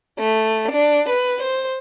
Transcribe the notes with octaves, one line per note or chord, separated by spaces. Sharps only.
A3
D4
B4
C5